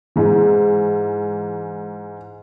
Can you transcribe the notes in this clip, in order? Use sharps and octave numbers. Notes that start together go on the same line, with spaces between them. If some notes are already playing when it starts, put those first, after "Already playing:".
G#2 E3